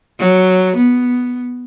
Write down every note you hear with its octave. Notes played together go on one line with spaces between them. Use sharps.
F#3
B3